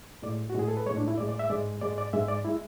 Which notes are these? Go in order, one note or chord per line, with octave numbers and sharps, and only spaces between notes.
A2 G#3 D5
F#4
A2 G#3 G#4
A4
B4
A2 G#3 C#5
D4
E4
A2 G#3 D5
D5
E5
G#2 G#3 D5
G#2 G#3 D5
D5
G#2 G#3 E5
D5
G#3 E4